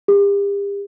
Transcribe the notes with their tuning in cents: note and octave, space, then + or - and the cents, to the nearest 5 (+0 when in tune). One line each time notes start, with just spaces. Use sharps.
G4 +40